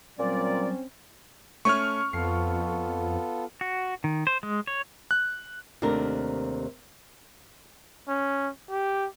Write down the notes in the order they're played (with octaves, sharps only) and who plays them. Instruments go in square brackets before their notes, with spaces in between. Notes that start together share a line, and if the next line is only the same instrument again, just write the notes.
[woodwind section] A#2 D5 [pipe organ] F#3 G3 [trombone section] C4 C#4
[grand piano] A3 C#4 C#5 [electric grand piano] C#6 F6
[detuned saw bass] F2 [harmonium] B3 F4 A4 [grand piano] C7
[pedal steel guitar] F#4
D#3
C5
G#3
C#5
[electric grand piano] F#6
[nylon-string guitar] D#2 C3 A3 D4 A#4
[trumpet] C#4
G4